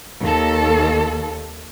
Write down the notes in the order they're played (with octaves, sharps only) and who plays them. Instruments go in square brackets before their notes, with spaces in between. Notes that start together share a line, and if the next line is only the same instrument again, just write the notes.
[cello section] D#2 A4